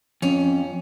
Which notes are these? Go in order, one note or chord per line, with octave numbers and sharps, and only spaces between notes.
F2 C#4